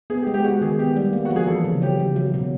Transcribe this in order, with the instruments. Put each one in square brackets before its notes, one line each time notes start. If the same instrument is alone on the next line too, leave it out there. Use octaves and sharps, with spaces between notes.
[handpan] B3 [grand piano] G#4
[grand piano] G4
[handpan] G#3
[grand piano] G4
[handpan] G#3 [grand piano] F#4
[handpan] D#3 [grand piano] G#4
[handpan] B3 [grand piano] G4
[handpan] G3
A#3
[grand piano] F#4
[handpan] F3
[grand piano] G#4
[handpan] E3 [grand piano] A4
[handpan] C#3
[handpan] F#3 [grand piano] G4
[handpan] C#3
F#3
B2